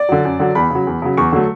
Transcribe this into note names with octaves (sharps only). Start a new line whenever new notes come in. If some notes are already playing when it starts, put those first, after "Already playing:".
Already playing: D5
D3 F#3
F#2
D3 F#3
E2 B5
C#3 F#3
E2
C#3 F#3
E2 C#6
D3 F#3 A3